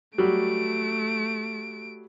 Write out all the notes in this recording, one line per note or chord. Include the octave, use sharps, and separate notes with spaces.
F#3 G3 A3 D7